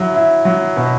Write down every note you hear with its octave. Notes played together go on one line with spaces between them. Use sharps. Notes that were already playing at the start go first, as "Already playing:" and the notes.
Already playing: F#3 E4
E4
F#3
B2